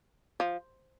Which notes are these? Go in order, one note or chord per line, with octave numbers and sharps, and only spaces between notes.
F3